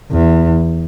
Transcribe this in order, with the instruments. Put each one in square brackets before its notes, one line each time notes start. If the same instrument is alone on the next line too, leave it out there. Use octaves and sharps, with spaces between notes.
[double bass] E2